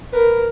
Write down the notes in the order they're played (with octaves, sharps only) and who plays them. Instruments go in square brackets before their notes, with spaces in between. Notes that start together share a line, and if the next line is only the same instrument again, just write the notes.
[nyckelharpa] A#4 [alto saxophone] B4